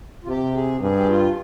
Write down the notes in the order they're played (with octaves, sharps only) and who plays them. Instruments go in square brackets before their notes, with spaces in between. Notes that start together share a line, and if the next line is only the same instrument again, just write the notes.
[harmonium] F4
[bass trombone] C3 [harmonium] G4
[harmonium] G#4
[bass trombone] G2 [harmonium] G#4
[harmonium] G4
F4